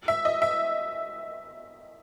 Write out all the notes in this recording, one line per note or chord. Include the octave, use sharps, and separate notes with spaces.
E5
D#5
E5